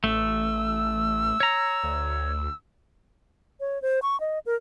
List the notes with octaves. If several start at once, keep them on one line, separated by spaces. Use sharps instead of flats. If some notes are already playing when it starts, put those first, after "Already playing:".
A1 A3 E6
C#5 A#5
D2
C#5
C5
C#6
D#5
A#4